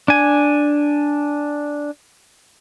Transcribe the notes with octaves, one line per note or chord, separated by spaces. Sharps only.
D4 G#5